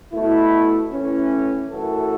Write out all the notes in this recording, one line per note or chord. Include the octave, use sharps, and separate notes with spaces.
B2 A3 E4
A2 E3 C#4
F#2 E3 A3 F#4 A4